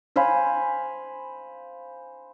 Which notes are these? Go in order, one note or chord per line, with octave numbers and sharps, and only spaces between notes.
C5 F5 G#5 B5